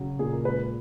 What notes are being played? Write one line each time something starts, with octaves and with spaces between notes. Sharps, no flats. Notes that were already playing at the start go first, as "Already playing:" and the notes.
Already playing: C#3 F#3
A#2 G#4
A#4
G#3 B4